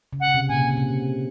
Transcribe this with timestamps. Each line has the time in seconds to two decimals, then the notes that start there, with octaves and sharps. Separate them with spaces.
0.13 C#3
0.20 F#5
0.28 C#3
0.34 C3
0.49 A#2 G#5
0.56 C3
0.70 C#3
0.77 C3